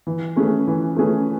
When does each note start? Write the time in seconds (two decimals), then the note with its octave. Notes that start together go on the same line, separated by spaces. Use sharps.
0.07 E3
0.36 A3 C#4 G#4 B4
0.67 E3
0.96 A3 C#4 G#4 B4